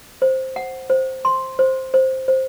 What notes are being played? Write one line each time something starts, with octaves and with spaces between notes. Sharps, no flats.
C5
F#5
C5
C6
C5
C5
C5